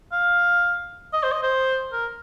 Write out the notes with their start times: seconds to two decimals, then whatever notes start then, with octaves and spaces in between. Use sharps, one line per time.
0.12 F5
1.13 D#5
1.23 C5
1.32 D#5
1.43 C5
1.92 A#4